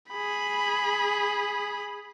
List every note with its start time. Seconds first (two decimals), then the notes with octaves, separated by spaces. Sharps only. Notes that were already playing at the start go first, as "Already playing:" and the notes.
0.11 G#4 B5